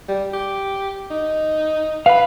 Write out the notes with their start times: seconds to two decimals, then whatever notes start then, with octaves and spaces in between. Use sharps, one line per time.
0.08 G3
0.33 G4
1.10 D#4
2.06 B4 F5 B5